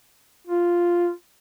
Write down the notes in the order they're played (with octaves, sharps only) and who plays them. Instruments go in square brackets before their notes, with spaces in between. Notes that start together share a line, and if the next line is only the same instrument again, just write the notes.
[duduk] F4